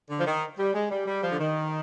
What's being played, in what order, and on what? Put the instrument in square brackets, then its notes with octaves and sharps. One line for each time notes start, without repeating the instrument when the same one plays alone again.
[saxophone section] D3
F3
D#3
G3
G#3
G3
G3
F3
D3
D#3